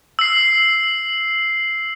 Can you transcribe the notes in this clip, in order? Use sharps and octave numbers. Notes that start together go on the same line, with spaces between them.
E6 C7